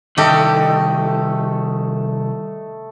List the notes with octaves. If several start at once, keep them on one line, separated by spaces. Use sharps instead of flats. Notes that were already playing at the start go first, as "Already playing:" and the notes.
C2 D#3 A3 G4 A4 D#5